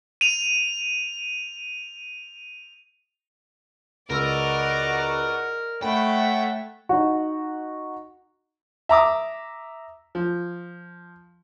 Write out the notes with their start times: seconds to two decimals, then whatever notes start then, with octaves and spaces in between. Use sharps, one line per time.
0.21 D#7 F7
4.10 C#2 F#4 A#4 D5 D#5 E6
5.82 A3 C#5 F#5 G5 B5
6.89 D#4 F#4
8.89 E5 A#5 D6 D#6
10.15 F3